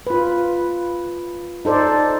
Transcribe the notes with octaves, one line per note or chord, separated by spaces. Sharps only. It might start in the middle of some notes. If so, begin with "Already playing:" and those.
F4 B4
D#4 A4 C5 D5